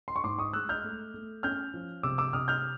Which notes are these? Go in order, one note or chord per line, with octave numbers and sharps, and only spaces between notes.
C6
C#6
G#2 C6 D6
C#6 D#6
G#3 E6 F#6
F6 G6
A3
A3
C#4 F6 G6
F3
C3 D6 E6
D6 E6
C3 D#6 F6
F6 G6